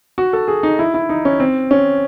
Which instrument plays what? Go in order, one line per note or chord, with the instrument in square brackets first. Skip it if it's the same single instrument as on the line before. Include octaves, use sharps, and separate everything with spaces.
[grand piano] F#4
A4
G#4
D#4
E4
E4
D#4
C#4
C4
C#4